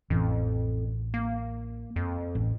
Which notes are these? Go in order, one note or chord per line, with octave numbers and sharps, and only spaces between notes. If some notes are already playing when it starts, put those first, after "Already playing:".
A1 F2 E3
A#3
F2
A1